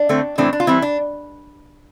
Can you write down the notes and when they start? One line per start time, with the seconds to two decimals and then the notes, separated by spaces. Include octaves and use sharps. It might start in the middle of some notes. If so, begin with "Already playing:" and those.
Already playing: D4
0.09 D3 A3 C4
0.38 A2 E3 A3 C4 D4
0.53 D4
0.60 F4
0.67 E3 G3 C4 E4
0.82 D4